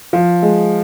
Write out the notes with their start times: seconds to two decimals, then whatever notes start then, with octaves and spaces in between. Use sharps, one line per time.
0.13 F3
0.42 G#3